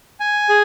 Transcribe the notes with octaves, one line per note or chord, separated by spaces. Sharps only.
G#5
G#4